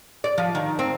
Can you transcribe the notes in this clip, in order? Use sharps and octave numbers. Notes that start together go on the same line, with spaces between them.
D5
F3
D#3
C4